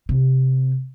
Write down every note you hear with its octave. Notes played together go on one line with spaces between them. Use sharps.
C3